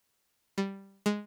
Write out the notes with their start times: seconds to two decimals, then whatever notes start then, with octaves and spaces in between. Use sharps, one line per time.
0.58 G3
1.06 G#3